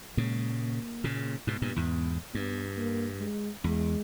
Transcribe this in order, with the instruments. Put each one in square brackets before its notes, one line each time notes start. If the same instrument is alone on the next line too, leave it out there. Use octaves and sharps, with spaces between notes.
[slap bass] A#2 C#3 [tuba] G#3
[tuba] A#3
[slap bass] A#2 C#3
[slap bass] G#2 B2 [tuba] B3
[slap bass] G2 A#2
E2 G#2
[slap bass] G2 [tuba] B3
[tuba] A#3
G#3
[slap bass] E2 [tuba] G#3